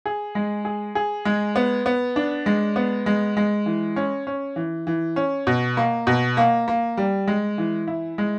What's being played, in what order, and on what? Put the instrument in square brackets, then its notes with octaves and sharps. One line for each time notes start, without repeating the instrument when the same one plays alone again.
[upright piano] G#4
G#3
G#4
G#4
G#3
B3
B3
D4
G#3
B3
G#3
G#3
E3
C#4
C#4
E3
E3
C#4
B2
A#3
B2
A#3
A#3
G3
G#3
E3
E4
G#3